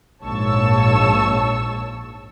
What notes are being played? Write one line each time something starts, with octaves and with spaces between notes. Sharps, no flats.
A#1 G#2 C#5 A5 C#6 E6